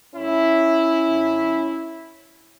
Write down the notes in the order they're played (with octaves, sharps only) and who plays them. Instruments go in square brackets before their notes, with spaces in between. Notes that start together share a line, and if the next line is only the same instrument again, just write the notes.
[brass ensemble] A2 F#3 C#4 E4
F#2 D3 F#3